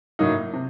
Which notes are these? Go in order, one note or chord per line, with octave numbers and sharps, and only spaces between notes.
A2 F#3 A#3 D#4
C3